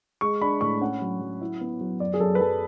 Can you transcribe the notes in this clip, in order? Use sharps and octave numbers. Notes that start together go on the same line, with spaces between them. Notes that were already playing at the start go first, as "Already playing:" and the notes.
G#3 C#6
D4 B5
A2 C#6
C#4 F#5
F#3
F#3
E4
B3
F#3
F#2 D5
G#4
F#2 A4
B4
F#2 A4